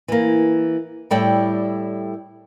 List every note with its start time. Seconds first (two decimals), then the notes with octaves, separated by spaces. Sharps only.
0.08 E3 A#3
1.11 A2 G3 E4 A4 D5 G5